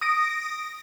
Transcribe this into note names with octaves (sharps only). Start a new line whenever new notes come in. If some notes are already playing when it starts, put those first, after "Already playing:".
D#6 A#6 D7